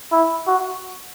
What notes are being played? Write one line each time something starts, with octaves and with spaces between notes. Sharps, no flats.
E4
F#4